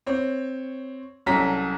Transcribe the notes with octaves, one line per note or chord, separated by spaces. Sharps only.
C4 C#5
C2 F#3 C#4 A4 A#5 B6